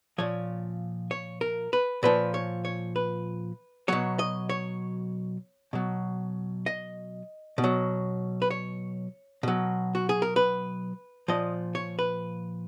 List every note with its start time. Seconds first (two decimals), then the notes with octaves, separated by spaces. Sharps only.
0.18 A#2 F3 C#5
1.11 C#5
1.41 A#4
1.73 B4
2.03 A#2 F3 B4
2.34 C#5
2.65 C#5
2.96 B4
3.88 B2 F#3 C#5
4.19 D#5
4.49 C#5
5.73 B2 F#3
6.66 D#5
7.58 B2
7.64 F#3
8.42 B4
8.50 C#5
9.43 B2 F#3
9.95 F#4
10.09 G#4
10.22 A#4
10.36 B4
11.28 A#2 F3 D#5
11.75 C#5
11.99 B4